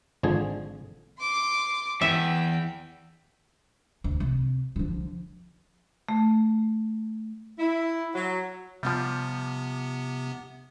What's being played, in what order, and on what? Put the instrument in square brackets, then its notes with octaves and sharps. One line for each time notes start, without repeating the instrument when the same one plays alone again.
[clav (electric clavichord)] G#1 D3 F3 G#4
[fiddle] C6 D6
[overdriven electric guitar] E2 [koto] E5 [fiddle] G5
[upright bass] D2
C3
D3 F3
[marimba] A3
[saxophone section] E4
F#3
[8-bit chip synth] C3 B3 [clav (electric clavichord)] F3 G3